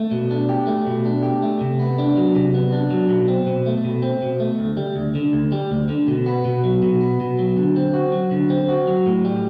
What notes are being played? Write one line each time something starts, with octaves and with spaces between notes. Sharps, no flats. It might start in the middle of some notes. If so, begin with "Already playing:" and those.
Already playing: A3
B2
D4
G4
A3
B2
D4
G4
A3
C3
B3
D4
F#3
C3
B3
D4
F#3
B2
C4
B2
A3
B2
C4
B2
A3
D2
G3
D2
D3
D2
G3
D2
D3
B2
B3
B2
F#3
B2
B3
B2
F#3
D3
C4
F#4
F#3
D3
C4
F#4
F#3
A2
G3